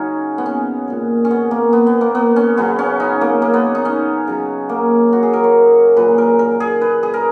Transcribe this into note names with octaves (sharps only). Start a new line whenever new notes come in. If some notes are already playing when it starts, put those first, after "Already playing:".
Already playing: C#3 F#3 C#4 D#4 F#4 G#4
B3
C#4
A#2 G#3
C#4
B3
A#3
B3
B3
A#3
B3
C#4
C#3 F#3 B3
C#4
D#4
A#3
A#3
B3
D#4
C#4
C#3 F#3
A#3
F#4
G#4
A#4
C#5
A#2 F#3 B4
A#4
A#4
G#4
B4
G#4
A#4